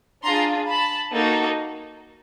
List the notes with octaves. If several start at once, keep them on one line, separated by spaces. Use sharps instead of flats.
D4 F4 G#4 A#5 C6
A5 B5
A#3 D#4 F#4 A4